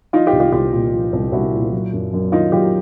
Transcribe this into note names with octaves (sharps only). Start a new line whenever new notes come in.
F3 D#4 F4
F4 G4
C2
F4 G4
C2 F4 G4
A#2
F3
C2
C2 E4 F#4
A#2
F#3
F#2
F#2
D#3 D#4 F4
F#3 F4 G4